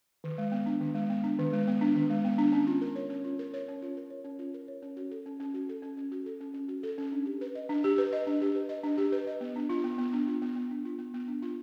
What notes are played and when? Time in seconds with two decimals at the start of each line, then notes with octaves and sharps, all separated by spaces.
0.24 D#3
0.38 G#3
0.52 B3
0.66 D4
0.81 D#3
0.95 G#3
1.09 B3
1.24 D4
1.39 D#3
1.53 G#3
1.68 B3
1.81 D4
1.96 D#3
2.10 G#3
2.25 B3
2.38 D4
2.52 C#4
2.67 F4
2.81 A#4
2.96 C#5
3.10 C#4
3.24 F4
3.39 A#4
3.54 C#5
3.68 C#4
3.82 F4
3.97 A#4
4.10 C#5
4.25 C#4
4.39 F4
4.54 A#4
4.68 C#5
4.82 C#4
4.97 F#4
5.11 A4
5.26 C#4
5.40 C#4
5.54 F#4
5.69 A4
5.82 C#4
5.97 C#4
6.12 F#4
6.26 A4
6.41 C#4
6.54 C#4
6.68 F#4
6.83 A4
6.98 C#4
7.12 D4
7.26 G4
7.41 B4
7.55 D#5
7.69 D4
7.84 G4
7.98 B4
8.13 D#5
8.27 D4
8.42 G4
8.55 B4
8.69 D#5
8.83 D4
8.98 G4
9.12 B4
9.27 D#5
9.41 B3
9.56 D4
9.69 F4
9.84 B3
9.98 B3
10.13 D4
10.27 F4
10.42 B3
10.56 B3
10.71 D4
10.85 F4
10.99 B3
11.14 B3
11.28 D4
11.42 F4